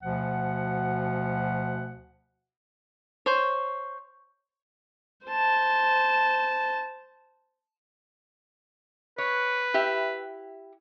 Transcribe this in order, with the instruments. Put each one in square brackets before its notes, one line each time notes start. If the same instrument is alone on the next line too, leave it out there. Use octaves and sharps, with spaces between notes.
[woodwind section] D2 B2 F3 F#5
[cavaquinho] C5 C#5
[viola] C5 A5
[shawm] B4 [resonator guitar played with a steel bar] C#5
[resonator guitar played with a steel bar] E4 G4 E5